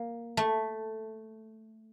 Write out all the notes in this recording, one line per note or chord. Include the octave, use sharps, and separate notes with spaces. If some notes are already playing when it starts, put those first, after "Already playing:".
Already playing: A#3
A3